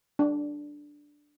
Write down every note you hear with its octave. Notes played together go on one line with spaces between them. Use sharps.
D4